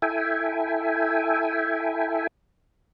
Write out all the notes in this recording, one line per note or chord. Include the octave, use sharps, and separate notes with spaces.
E4 A4 E5 G5 G#5